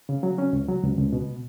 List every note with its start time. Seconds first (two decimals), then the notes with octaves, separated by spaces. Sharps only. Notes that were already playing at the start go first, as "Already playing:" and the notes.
0.09 C#3
0.23 F#3
0.38 C#4
0.53 C#2
0.68 F#3
0.83 C#2
0.98 C#2
1.13 B2